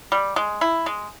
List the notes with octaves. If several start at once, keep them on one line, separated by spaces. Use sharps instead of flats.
G3
G#3
E4
G#3